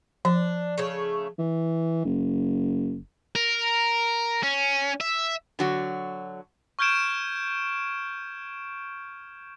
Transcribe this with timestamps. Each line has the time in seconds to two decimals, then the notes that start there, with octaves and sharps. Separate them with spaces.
0.25 F3 D4
0.78 C#3 A3 C#5
1.39 E3
2.05 F#1
3.35 A#4
4.43 C#4
5.00 E5
5.59 D3 F#3 F#4
6.79 C#6 F6 G6 G#6 D7 E7